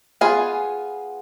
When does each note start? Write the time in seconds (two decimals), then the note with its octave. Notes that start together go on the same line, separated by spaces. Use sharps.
0.21 B3 F4 G#4